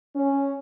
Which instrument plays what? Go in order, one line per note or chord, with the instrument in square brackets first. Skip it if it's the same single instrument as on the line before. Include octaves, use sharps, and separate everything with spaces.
[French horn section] C#4